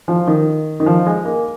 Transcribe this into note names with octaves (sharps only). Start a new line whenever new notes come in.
F3
D#3
D#3
F3
G#3
A#3